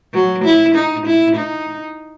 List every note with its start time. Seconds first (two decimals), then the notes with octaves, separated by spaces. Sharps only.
0.14 F#3
0.45 E4
0.75 D#4
1.06 E4
1.36 D#4